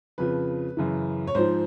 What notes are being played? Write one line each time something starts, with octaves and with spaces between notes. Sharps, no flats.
F2 C#3 F3 B4
F#2 C#3 E3
C#5
G#2 F3 C5